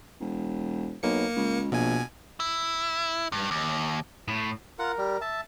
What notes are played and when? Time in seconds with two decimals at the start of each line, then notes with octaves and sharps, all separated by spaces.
0.20 E1
1.03 B1 A#3 C#7
1.36 C#2
1.72 A#1 B2 G#5
2.40 E4
3.32 G2
3.51 D#2
4.28 A2
4.79 F4 A#4 F#5
4.98 G3
5.21 E5 A5